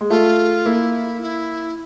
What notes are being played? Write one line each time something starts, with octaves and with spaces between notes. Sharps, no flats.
G#3
A3 F4
A#3 E4
E4